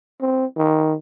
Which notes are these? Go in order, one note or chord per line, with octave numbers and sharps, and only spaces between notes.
C4
D#3